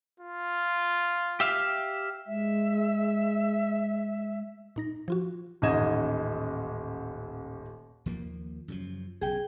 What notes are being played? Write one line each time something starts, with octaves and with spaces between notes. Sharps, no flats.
F4
G4 E5 F5
G#3 E5
A#2 D#4 A#6
F3 F4 F#4
D#1 A1 D#4 D#5 G#6 E7
D#2 F3 A#3
F#2 C#3 F3
B1 C#3 G#4 G5